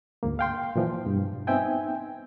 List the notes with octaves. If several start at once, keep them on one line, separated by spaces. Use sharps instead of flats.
D2 G#2 A#3
F5 G5 C6
A#2 E3 F3
G2 B2
B3 C4 D#4 E5 G5 G#5